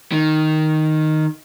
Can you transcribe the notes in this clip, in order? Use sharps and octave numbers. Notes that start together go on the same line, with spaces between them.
D#3